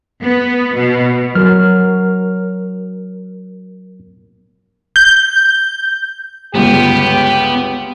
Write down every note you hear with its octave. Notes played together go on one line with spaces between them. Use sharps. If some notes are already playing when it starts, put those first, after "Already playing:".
B3
B2
F#3 A#4 F6
G6
G1 C#2 B3 G4